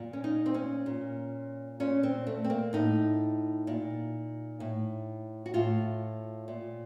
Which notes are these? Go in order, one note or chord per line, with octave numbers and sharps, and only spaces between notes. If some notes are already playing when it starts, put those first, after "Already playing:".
Already playing: A#2
C#4
D#4
C4
C#4
A#2
A#2 C#4
C4
A3
C4
A#3
A2 D#4
A#2
A2
F#4
A2 F4
A#2